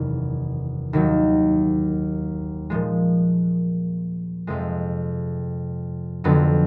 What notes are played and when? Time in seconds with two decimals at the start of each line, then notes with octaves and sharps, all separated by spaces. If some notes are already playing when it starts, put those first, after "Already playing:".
Already playing: F#1 E2 C3 D#3
0.93 D#2 D#3 F#3
2.70 A#2 F3 G#3
4.47 F2 C3 F3 G#3
6.24 F2 D3 F#3 B3